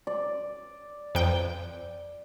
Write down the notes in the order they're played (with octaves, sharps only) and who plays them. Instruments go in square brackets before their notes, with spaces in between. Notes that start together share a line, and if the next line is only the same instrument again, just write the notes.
[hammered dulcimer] D5
[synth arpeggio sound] F2 G5